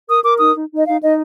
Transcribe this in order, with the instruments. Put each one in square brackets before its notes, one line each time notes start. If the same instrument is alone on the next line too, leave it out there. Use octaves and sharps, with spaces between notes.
[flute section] A#4 D#6
A#4 D6
D#4 D#6
D#4
D#4
D#5
D#4 F5
D#4 D#5